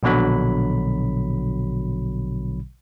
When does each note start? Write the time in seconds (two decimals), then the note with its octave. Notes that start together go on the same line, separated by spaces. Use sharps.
0.03 A#1 B2 D3 F#3 B5